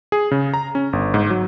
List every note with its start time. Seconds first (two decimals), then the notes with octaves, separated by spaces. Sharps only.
0.12 G#4
0.31 C#3
0.54 A#5
0.75 C#4
0.93 G1
1.14 G#2
1.30 F#3